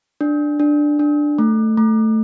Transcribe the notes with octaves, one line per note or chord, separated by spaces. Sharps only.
D4
D4
D4
A3
A3